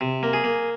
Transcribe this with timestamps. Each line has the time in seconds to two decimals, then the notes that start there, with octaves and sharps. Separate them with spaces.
0.01 C3
0.23 A#3
0.33 G#4
0.44 A#3